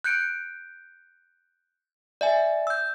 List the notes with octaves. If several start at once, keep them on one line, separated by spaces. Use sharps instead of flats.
F#6 G6 C#7 D7
D5 E5 G#5
E6 G6